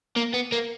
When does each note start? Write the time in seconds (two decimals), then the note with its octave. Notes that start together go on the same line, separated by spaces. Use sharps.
0.17 A#3
0.34 B3
0.52 A#3